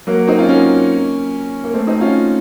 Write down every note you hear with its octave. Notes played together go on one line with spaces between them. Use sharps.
F#3 A#3
C4 D#4
C#4 F4
A#3 C#4
A#3
A3 C4
C4 D#4
C#4 F4